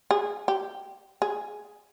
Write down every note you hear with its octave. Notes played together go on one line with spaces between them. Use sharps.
G#4
G4
G#4